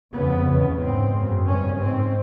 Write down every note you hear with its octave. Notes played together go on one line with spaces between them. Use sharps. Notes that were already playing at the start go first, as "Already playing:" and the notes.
F2 C#3 B3
E2 C#3
G#2 C4
F#2 C#3
G2 C#4
G#2 C4